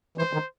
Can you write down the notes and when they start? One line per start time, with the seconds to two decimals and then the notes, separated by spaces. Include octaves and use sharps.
0.18 E3 C5
0.33 D#3